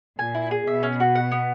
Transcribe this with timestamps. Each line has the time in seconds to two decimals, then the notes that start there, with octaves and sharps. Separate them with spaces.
0.19 A#2 G#5
0.35 E4
0.51 G#4
0.67 B2 E5
0.83 C#4
1.00 F#4
1.15 F#5
1.32 B3